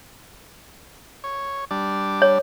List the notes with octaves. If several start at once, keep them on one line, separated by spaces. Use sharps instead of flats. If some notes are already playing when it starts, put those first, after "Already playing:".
C#5
G3 D4 D5
C#5